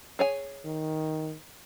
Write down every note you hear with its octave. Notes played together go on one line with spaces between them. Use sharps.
G#4 C#5 G#5
D#3